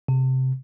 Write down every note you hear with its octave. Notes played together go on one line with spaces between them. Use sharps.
C3